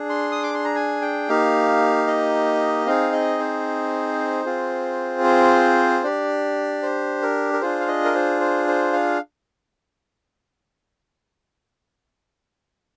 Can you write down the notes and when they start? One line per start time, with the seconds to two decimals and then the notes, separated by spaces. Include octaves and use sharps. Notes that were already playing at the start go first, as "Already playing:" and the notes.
Already playing: D4 G#4
0.10 C6
0.31 D#6
0.43 D6
0.54 C6
0.65 A#5
0.75 G#5
1.02 G5
1.29 A#3 D#4 G4 F5
2.07 D#5
2.87 C4 D#4 G#4 F5
3.13 D#5
3.40 C5
4.45 C4 F4 G#4
5.24 C5
6.04 D4 G4 D5
6.82 C5
7.22 A#4
7.53 A#4
7.61 D4 F4 G#4 C5
7.80 F5
7.87 D#5
8.05 A#4
8.15 C5
8.41 C5
8.68 C5
8.93 F5